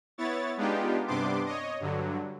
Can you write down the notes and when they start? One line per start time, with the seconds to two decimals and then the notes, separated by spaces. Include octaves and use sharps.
0.18 B3 E4 C#5 A6
0.57 G#3 B3 D4 D#4 F4 G4
1.07 G2 C3 B3 D4 C6 D6
1.46 C#5 D#5
1.80 G2 D3 F#3